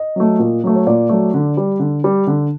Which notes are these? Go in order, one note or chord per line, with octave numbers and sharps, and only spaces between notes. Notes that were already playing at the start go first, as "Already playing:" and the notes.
Already playing: D#5
F#3 A3
A#2
F#3 A3
C#5
A#2 D5
F#3 A3
D3
G3
D3
G3
D3